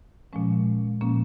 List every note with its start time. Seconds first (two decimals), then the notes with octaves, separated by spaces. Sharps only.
0.33 A#2 F3 G#3 C#4
1.01 A#2 F3 A#3 C#4